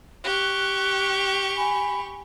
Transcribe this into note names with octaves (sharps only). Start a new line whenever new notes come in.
G4 C#6 F#6
G#5 B5